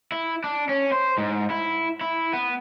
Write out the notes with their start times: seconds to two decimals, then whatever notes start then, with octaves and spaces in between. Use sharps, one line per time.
0.12 E4
0.44 D4
0.69 C#4
0.92 C5
1.18 G#2
1.50 E4
2.01 E4
2.34 B3